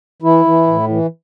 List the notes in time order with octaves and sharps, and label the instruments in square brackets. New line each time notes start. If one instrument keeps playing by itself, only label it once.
[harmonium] E3 E4
E3
A2
E3